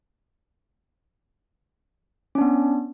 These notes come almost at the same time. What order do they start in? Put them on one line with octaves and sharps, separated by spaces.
C#4 D4 B3